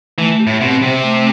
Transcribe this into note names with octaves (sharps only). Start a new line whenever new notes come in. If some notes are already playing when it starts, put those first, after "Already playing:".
E3 A3
G4
A2
B2 C4
C3 C5
A3